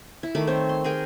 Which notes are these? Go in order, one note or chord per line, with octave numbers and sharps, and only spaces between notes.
E4
D#3 A3 B5 D6
C4 C5 C#5
C6
G#4 A#4 G5 G#5